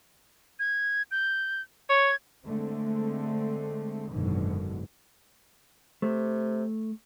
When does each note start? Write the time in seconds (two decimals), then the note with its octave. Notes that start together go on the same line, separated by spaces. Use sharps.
0.59 G#6
1.11 G6
1.89 C#5 G#6
2.46 D3 G#3 A3 C4
4.11 F#1 G#2 B2 D3 D#3 F#3
6.02 C3 A3